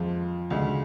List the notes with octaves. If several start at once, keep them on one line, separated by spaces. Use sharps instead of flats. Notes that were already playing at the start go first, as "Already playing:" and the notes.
Already playing: F2 F3 G#3 F4
D2 C#3 G#3